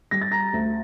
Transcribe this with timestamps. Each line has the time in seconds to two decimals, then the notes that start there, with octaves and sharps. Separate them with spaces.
0.11 G3 A#6
0.22 A6
0.32 A#5 A#6
0.53 D2